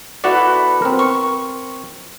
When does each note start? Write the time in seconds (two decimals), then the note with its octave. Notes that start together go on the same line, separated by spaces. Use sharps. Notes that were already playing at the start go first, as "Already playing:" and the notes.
0.24 B3 E4 F#4 A4 B4 D5
0.82 C4 A#4
0.99 C#6